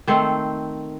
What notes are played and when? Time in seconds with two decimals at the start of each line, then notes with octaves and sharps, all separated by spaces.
0.07 D#3 A3 C4 C5